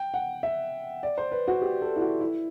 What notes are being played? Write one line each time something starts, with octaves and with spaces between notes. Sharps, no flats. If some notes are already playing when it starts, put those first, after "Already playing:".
Already playing: G5
F#5
E5
D5
C5
B4
F#4
G4
A4
E4
F#4
E4